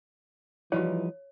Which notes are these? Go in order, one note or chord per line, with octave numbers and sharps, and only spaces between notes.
E3 F3 G3 D#4 E4 F#4 C#5